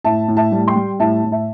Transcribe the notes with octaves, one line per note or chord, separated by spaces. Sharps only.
A2 E5 A5
A2
E5 A5
G3
G5 C6
G3
A2 E5 A5
A2
E5 A5